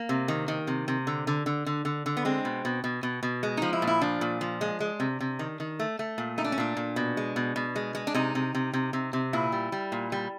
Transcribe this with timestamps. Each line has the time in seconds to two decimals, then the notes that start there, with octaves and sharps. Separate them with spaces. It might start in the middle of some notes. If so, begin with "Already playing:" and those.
Already playing: A#3
0.09 C3
0.28 D#3
0.48 D#3
0.67 C3
0.88 C3
1.07 D3
1.27 D3
1.46 D3
1.66 D3
1.85 D3
2.06 D3
2.17 B3
2.25 G#3 C4
2.45 B2
2.65 B2
2.84 B2
3.03 B2
3.23 B2
3.43 G#3
3.57 F3 D#4
3.73 E4
3.82 A#2
3.87 E4
4.01 F3 D4
4.21 A#2
4.41 F3
4.61 G#3
4.80 G#3
5.00 C3
5.20 C3
5.39 D#3
5.60 D#3
5.79 A3
5.99 A3
6.18 A#2
6.38 A3 D#4
6.44 D4
6.52 C#4
6.58 A#2 D4
6.77 A#2
6.96 B2
7.17 G#3
7.36 B2
7.56 B2
7.76 G#3
7.95 G#3
8.07 D4
8.14 C3 D#4
8.35 C3
8.55 C3
8.73 C3
8.93 C3
9.13 C3
9.33 A#2 E4
9.52 G3
9.72 G3
9.92 A#2
10.12 G3